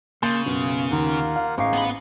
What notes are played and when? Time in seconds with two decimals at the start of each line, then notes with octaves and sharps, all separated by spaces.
0.23 C#3 A#3 C6 G6 A6
0.46 B1 F#2 B3 F4
0.91 D#2 D#3 A#3 F4 F#5
1.36 F5
1.58 A1 G#3 D#4 C5 F5 C#6 D6
1.73 B3 B5